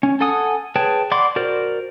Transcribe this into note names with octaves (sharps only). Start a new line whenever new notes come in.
C#4
A4 F#5 G#5 D#6
G#4 B4 C#5 G5 A5
D5 F#5 B5 C6 D6
F#4 A#4 C5 D5